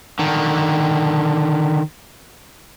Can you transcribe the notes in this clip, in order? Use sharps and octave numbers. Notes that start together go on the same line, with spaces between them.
D3 D#3